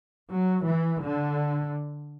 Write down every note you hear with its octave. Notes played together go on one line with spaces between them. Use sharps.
F#3
E3
D3